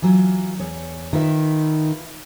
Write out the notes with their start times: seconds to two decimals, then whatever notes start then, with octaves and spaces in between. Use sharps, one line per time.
0.02 E3 F#3 F4
0.59 E2 C#5
1.13 D#3 F4 B4 E5